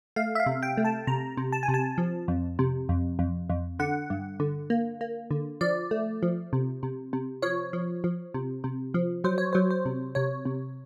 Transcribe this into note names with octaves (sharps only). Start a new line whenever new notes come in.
A3 F5
E5
F5
C3
G5
A3
A5
C3 A#5
C3
A5
G#5
C3
A5
F3
F2
C3
F2
F2
F2
D3 F#5
G2
D3
A#3
A#3
D3
F3 D5
A3
F3
C3
C3
C3
F3 C#5
F3
F3
C3
C3
F3
F#3 C5
C#5
F#3 C5
C5
C3
C3 C#5
C3